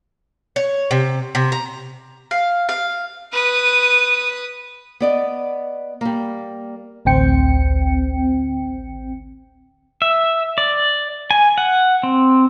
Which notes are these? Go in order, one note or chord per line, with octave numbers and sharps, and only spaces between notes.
C#5
C3
C3
A#5
F5
F5
B4 D#6
B3 D5 D#5
G3 A#3
A1 D2 C4 G5 C#7
E5
D5
G#5
F#5
C4